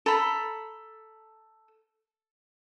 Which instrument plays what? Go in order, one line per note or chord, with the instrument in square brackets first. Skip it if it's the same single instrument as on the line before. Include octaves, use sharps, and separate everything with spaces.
[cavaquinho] A4 A#5 B5